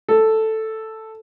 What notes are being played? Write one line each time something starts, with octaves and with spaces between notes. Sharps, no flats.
A4